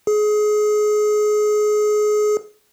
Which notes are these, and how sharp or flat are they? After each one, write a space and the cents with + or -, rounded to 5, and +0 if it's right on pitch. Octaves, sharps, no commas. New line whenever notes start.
G#4 +25